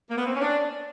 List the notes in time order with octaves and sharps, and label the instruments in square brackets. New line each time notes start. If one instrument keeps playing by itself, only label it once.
[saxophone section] A#3
B3
C4
C#4
D4